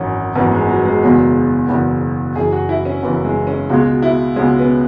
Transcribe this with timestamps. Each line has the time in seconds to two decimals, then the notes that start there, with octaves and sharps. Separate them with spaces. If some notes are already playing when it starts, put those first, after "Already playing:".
Already playing: G#1 F#2 E3 C#4
0.35 G#1 F#2 E3 B3
0.51 G#3
0.68 F#3
0.80 B3
0.85 G#3
1.02 F#1 E2 B2 F#3 B3
1.68 F#1 E2 B2 F#3 B3
2.35 F#1 F#2 E3 G#4
2.52 F#4
2.69 E4
2.85 C#4
3.02 F#1 F#2 E3 B3
3.25 G#3
3.47 C#4
3.69 C#2 B2 G#3 F#4
4.02 E4
4.36 C#2 B2 G#3 C#4
4.59 B3